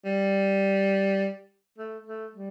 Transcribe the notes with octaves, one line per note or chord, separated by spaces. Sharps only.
G3
A3
A3
G3